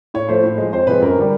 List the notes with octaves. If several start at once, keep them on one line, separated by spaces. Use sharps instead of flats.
A2 C#5
F3 A3 C5
A2
F3 G#3
F2 C5
C3 F3 G#3 B4
F#2 A#4
D3 G3